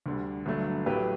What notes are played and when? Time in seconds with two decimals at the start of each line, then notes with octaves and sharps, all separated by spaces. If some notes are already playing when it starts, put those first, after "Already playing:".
0.06 D2 D3 G3
0.46 G1 G2 F#3 A3
0.86 A1 A2 F#3 A3 G4 B4